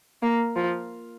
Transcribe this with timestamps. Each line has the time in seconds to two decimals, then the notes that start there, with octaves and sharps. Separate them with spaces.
0.22 A#3
0.56 F3